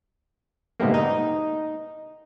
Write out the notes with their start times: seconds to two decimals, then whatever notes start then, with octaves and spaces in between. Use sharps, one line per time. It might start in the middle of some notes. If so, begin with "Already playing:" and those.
0.80 G#2 B2 D3 G3 A3 A#3
0.94 D#4